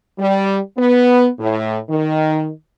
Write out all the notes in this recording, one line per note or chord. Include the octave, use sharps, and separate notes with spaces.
G3
B3
A2
D#3